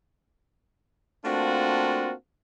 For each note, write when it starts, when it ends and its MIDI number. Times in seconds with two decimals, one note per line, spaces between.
1.25 2.12 57
1.25 2.12 58
1.25 2.12 60
1.25 2.12 62
1.25 2.12 65
1.25 2.12 66